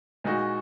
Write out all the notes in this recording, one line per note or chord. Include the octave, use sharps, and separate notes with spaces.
A#2 G#3 D#4 F#4